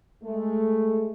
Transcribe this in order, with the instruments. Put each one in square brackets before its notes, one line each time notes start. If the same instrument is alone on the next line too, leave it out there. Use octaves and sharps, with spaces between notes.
[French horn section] G#3 A3